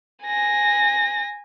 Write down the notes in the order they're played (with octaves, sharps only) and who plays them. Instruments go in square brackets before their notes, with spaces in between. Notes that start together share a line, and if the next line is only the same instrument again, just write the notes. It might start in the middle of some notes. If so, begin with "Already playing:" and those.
[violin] G#5 A#6